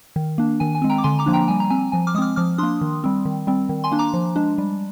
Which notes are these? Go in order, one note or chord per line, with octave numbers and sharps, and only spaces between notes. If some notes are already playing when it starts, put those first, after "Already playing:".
D#3
A#3 D4
D#3 G#5
G#5
G#3 C4
G5 A#5
D6
D3 G#5 C6
A#5 D6
F3 A#3 D4
G5 A#5
G3 G#5
A#5
C4 G#5
F3 G#5
D6 F6
G#3 C4 D6 D#6 F6
F3 D6 F6
A#3 D4 C6 D#6
D#3
G3 C4
D#3
G3 C4
D#3
G#5 C6
A#3 D4
A#5 D6
F3
G#3 D4
G3